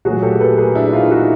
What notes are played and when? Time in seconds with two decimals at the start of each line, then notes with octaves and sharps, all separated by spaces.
0.05 A#2 F#3 A3 F#4 G#4
0.23 G4 A4
0.40 A4 B4
0.58 G#4 A#4
0.75 D4 E4
0.93 D#4 F4
1.11 E4 F#4